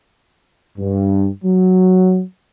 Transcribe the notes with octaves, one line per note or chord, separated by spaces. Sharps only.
G2
F#3